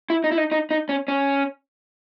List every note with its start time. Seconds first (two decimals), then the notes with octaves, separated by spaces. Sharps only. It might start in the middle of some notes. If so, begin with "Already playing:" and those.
0.10 E4
0.24 D#4
0.32 E4
0.37 D#4
0.52 D#4
0.71 D#4
0.89 C#4
1.08 C#4